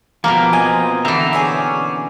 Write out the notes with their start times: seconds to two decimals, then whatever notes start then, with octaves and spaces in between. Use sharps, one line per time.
0.24 B2 F3 A#3 G4 F5
0.53 C4 F4 D#5 G#5
1.05 D3 E3 E5 G5 A#5
1.33 G#4 C#5 D5
1.58 C#4